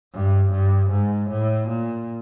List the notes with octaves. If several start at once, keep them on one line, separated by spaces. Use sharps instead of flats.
G2
G2
G#2
A2
A#2